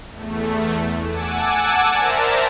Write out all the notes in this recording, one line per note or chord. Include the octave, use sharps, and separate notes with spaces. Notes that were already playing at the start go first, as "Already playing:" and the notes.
E2 A3
F#5 G#5 A5 D6 E6
A#4 C5 D5 E5 A5 A#5